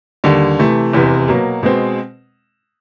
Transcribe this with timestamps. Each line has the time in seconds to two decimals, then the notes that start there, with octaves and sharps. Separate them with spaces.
0.24 D#2 D3 G3
0.59 C3 E3 A3
0.93 F1 E2 C3
1.28 B2 F#3 A#3
1.63 B2 G#3 C4